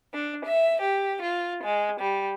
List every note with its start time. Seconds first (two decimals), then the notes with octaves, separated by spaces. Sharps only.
0.14 D4
0.45 E5
0.81 G4
1.22 F4
1.63 G#3
2.00 G3